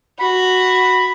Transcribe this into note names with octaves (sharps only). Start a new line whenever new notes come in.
F#4 B5